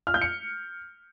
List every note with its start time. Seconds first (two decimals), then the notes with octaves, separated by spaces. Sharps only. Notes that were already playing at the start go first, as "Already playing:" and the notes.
0.07 F6
0.14 G6
0.21 C#7